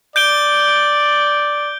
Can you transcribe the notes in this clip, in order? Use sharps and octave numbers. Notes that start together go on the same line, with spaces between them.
D5 G6 D7 G7